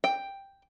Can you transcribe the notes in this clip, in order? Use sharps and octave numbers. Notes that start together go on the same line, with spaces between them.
G5